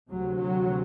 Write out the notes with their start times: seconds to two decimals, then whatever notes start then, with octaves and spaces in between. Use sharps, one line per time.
0.11 D2 C3 F#3
0.39 F#3